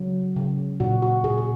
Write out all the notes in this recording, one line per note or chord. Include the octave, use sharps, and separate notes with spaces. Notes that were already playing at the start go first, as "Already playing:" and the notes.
Already playing: C#3 F#3
C#3
A#2 F#4
F#4
A#2 G#4
G#4